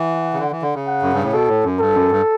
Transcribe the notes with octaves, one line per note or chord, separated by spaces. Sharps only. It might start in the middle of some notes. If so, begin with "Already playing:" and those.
Already playing: E3 F#5
C#3
D3
E3
D3
C#3
F#5
F#2
G2
A2
B2 A4
A2
F#2
G2 A4
F#2
G2